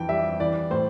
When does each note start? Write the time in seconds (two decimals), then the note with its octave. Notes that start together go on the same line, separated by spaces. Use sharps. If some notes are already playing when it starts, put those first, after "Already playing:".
Already playing: F2 E3 G5
0.09 G3 E5
0.40 E3 D5
0.71 A2 C5